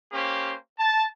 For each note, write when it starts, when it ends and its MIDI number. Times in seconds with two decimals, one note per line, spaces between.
0.13 0.54 58
0.13 0.54 61
0.13 0.54 67
0.13 0.54 72
0.79 1.03 81